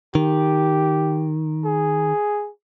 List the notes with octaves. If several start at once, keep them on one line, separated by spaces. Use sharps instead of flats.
D#3 G4
G#4